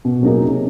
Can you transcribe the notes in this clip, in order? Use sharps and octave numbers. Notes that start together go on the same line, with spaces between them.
B2
F#3 A#3 D#4 G#4
C3